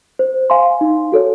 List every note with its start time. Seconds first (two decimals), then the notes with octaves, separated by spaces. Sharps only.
0.19 C5
0.50 F5 G#5 C6
0.81 D#4
1.12 F#4 A4 C#5